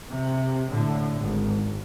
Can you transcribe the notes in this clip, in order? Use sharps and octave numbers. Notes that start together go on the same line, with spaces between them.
C3
A2 D3
G#1